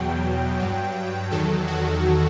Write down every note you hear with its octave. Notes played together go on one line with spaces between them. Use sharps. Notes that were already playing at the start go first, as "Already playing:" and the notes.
Already playing: E2 B2 F#3 G5
G2 F#3
E2 D#3 F#3 A4
F#4